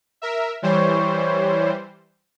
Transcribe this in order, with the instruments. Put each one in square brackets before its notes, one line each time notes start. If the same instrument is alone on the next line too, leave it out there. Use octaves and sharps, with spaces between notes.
[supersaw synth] A#4 E5
[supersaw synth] E3 G3 C5 [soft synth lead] C#5